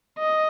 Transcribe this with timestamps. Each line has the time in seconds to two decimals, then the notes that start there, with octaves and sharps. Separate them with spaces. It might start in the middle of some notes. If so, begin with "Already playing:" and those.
0.19 D#5